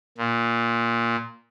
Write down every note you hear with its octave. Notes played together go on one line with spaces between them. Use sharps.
A#2